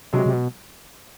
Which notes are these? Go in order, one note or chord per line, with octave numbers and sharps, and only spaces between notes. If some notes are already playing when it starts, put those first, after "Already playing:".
C3 F#3 G#3
C3
B2